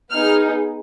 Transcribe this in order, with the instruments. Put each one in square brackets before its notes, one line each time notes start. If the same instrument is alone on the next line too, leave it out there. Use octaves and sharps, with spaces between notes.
[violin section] B3 D#4 G#4 F6